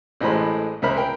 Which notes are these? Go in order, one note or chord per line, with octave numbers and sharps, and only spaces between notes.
A1 A2 G#3 C5 B5
C#2 A#4 C5 E5 B5 F6
A#4 G5